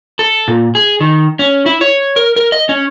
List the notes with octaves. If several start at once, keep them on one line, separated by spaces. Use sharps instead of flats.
A4
A#2
G#4
D#3
C#4
E4
C#5
A#4
A#4
D#5
C#4